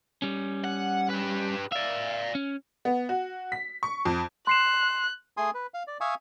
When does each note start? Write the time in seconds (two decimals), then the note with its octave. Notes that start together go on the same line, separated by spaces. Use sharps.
0.22 G3 C#4
0.64 F#5
1.10 G4 B4
1.72 D5 E5 F5
2.35 C#4
2.85 B3
3.09 F#4
3.52 B6
3.83 C#6
4.05 F2
4.47 C6 F#6 C7 E7
5.37 A3 G#4 G#5 C6 D#6
5.54 B4
5.74 F5
5.87 D5
6.01 E5 F5 G#5 C#6 D#6